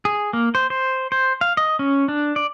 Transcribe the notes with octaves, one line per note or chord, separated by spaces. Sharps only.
G#4
A#3
C5
C5
C5
F5
D#5
C#4
D4
D5